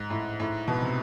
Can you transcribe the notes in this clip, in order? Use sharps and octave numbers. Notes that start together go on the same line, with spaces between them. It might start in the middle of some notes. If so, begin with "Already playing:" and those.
Already playing: G#2
A2
A2
B2
C3